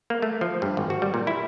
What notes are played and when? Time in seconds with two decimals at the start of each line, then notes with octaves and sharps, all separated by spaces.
0.10 A#3
0.22 A3
0.41 F3
0.62 G2
0.77 G#1
0.90 F#4
1.02 G3
1.14 A#2
1.27 E4